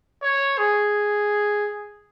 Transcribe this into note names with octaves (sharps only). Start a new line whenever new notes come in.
C#5
G#4